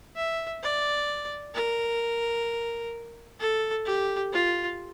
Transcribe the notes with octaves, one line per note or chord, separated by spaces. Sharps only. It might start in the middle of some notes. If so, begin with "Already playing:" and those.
E5
D5
A#4
A4
G4
F4